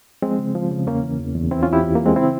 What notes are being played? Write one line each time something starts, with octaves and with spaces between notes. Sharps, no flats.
F3 G#3 C4
C#3
F3
C#3
E2 A#3 C#4
E3
E2
E2
E3 C4 E4
C#4 F4
E2 E4 G4
E2
E3 A#3
G#3 C4
C#3 C4 E4